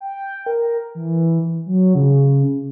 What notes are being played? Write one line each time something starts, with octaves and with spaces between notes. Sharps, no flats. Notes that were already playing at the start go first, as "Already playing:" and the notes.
G5
A#4
E3
F#3
C#3